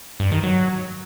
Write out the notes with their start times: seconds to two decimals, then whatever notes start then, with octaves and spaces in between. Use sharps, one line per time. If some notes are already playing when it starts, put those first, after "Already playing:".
0.20 G2
0.32 D#3
0.43 F#3